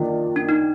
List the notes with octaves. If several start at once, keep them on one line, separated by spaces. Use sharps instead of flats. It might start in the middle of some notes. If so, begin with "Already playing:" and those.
Already playing: D#3 A#3 D4 F4
D4
D#4